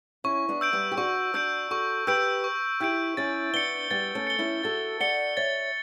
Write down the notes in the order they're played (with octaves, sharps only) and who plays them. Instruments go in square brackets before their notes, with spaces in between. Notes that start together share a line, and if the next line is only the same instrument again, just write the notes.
[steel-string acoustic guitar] C#4 E4 [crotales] C#6
[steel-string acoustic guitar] B3 D4
[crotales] E6 G6 D7
[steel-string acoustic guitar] G3 B3
G4
[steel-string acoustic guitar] D4 F#4 [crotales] C#6
[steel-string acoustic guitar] D4 F#4 [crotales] E6 G6 D7
[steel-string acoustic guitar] F#4 A4 [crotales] C#6
[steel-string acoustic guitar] G4 B4 [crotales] E6 G6 D7
[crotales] C#6
[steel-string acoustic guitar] E4 G4 [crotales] E6 G6 D7
[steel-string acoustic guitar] C#4 E4 [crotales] A6
[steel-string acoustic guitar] B3 D4 [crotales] C#7 G7
[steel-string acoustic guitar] G3 B3 [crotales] A6
[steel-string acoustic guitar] A3 C#4
[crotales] C#7 G7
[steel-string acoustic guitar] C#4 E4
[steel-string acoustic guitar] F#4 A4 [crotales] A6
[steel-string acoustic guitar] D5 F#5 [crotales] C#7 G7
[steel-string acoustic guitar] C#5 E5 [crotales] A6